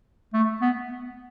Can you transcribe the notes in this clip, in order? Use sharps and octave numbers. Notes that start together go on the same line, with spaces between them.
A3
B3